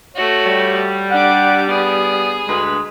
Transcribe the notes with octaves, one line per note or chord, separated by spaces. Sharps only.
A3 F#4 C#5
G3
D4 F#5 D6
B3 G#4
D2 G#3 B4